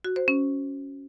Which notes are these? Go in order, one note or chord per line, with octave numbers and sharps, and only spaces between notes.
F#4
C5
C#4